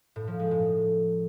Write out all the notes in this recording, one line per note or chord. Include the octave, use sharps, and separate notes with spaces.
A2
F3
G#3
A2